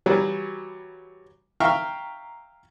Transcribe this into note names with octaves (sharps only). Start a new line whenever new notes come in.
E3 F#3 G3
E5 F5 G5 A#5 C#6 F6